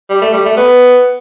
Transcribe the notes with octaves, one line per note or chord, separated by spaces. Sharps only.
G3
A3
G3
A3
B3